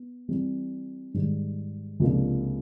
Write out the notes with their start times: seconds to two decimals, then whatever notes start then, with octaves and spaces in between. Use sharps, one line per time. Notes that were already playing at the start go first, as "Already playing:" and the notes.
Already playing: B3
0.28 E3 G3 C4
1.14 G#2 D#3 G3
2.00 C#2 C3 F3 A#3 D4